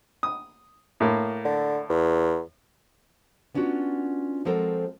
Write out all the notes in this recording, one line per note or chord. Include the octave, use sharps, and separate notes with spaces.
D#6
A2 A#3
D3
E2
B3 C#4 D4 F4 F#4
F3 G#3 C4 F#4 A4 A#4